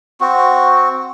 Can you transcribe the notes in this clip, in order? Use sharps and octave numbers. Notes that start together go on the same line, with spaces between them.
C4 F#4